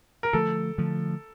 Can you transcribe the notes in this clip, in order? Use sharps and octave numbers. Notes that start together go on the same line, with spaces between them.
A#4
D3 F3 A3 A4
D3 F3 A3